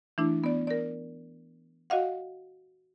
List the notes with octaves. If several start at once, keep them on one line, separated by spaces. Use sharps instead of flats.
E3 A3 D4 E4
B3 D5
A#4 D5
F#4 D#5 F5 F#5